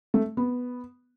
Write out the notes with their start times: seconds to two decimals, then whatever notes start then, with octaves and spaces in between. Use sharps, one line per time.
0.14 A3
0.37 B3